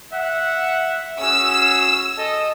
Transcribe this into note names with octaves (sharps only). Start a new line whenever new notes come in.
E5 F#5
C#4 F#4 G#4 E6
A4 D#5